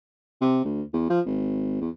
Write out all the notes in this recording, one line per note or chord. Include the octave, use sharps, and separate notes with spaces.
C3
D2
E2
F3
G#1
E2